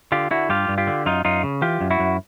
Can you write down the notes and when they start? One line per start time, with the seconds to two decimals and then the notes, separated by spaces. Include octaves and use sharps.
0.12 D3 F4 G4
0.31 D3 E4 F#4
0.49 G2 F4 G4
0.69 G2
0.78 F4 G4
0.87 D3
1.06 F#2 D#4 F4
1.25 F#2 D#4 F4
1.44 C#3
1.62 E3 F4 G4
1.81 F#2
1.91 E4 F#4
2.00 F#2